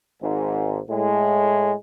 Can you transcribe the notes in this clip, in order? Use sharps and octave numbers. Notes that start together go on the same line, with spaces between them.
G#1 G#2
A2 G#3